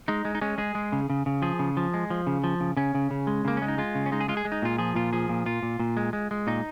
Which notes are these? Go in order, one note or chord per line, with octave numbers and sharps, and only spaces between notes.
G#3 D#4
G#3
D#4
G#3 C#4
G#3 G#4
G#3
C#3
C#3
C#3
F3 G#4
C#3
F3
G#3
F3
C#3
F3
C#3
C#3 C#4
C#3
C#3
G#3
C#3 A#3
G#3 C#4
D#4
G#3 F4
C#3
C#4
G#3 D#4
G#4
G#3 F4
G#4
G#3
D#4
A#2 F4
F3 G#4
A#2 F4
F3 G#4
A#2
A#2 F4
A#2
A#2
G#3
G#3
G#3
A#2 D#4